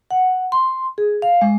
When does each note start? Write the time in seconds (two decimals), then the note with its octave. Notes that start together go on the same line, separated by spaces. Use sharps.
0.11 F#5
0.52 C6
0.98 G#4
1.22 F5
1.41 G#3